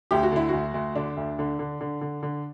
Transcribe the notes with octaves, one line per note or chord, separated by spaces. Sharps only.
D2 G4
F#4
D3 E4
D2 F#4
D2
D3 D4
D2
D3
D3
D3
D3
D3